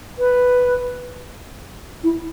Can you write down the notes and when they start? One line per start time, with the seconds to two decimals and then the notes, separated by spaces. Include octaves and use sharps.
0.19 B4
2.04 E4